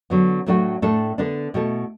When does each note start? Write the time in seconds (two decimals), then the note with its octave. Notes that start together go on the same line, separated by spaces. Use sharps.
0.10 D3 F#3 B3
0.46 A2 F#3 A3 D4 F#4
0.82 A2 A3 D4 A4
1.18 D3 B3 D4
1.54 B2 A3 E4 A4